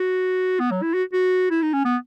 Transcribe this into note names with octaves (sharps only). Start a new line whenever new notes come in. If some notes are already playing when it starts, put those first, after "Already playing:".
Already playing: F#4
B3
F#3
E4
F#4
F#4
E4
D#4
C#4
B3